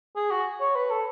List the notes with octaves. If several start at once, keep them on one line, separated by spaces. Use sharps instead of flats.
G#4
F#4
C#5
B4
A4